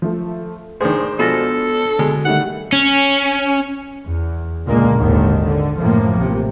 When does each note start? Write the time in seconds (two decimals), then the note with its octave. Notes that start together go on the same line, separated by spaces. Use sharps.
0.02 F3 A3
0.81 A2 D#3 D4 G#4 C5
1.19 B2 F3 G#3 B3 A4 A6 A#6
1.99 B2 D3 G#3
2.25 D#3 G3 A3 F#5
2.73 C#4
4.06 E2
4.66 C#2 A#2 D3 G#3 A#3
4.96 G#1 D#2 G#2 D3 D#3
5.44 D3
5.78 F#1 A2 F3 A#3
6.19 A1 C3